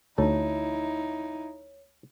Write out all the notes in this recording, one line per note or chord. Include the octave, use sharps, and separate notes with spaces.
D2 D#4 E4 A4 C#5